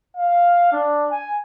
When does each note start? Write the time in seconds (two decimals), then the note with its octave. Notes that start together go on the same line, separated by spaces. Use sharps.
0.17 F5
0.72 D4
1.11 G#5